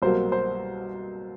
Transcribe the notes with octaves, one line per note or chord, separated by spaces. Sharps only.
C2 B2 F#3 A#3 C5
C5